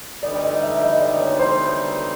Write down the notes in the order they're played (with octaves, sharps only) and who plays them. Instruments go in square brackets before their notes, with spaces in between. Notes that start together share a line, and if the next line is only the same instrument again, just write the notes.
[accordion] D2 D3 G3 B3 D#4 [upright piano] D5
[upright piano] D#5
E5
D#5
D5
C#5
C5